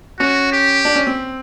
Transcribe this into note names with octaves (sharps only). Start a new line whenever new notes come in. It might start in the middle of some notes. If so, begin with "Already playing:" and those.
C#4 F#4
G4
D4
C#4
C4